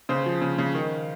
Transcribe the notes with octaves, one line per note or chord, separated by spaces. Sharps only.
C#3 C5
F3
C#3
C#3
D#3